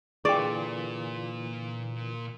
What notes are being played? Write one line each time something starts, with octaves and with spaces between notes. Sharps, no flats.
A#2 D3 E3 F4 G#4 D5 G5